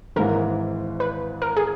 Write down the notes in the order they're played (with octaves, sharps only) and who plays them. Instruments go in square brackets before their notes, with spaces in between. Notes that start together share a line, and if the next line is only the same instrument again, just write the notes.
[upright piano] G#1 G#2 E3 [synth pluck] A#4
[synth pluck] B4
A#4
G#4